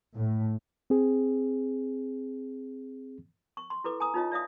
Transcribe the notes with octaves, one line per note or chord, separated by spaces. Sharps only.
A2
C4 G#4
C#6
C6
E4 A4 B4 D6
G#5 A#5 D#6
D#4 F4 C#5 D#5
D5 E5 F5 D#6